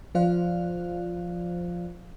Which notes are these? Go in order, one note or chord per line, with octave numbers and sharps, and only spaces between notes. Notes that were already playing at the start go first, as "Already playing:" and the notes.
F3 F4 C5 D5 F5 F#6